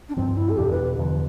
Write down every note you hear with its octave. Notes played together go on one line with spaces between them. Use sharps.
D4
G2 F3 B3 C4
E4
A4
E2 B2 B3 D4 G4
B4
E2 D3 F3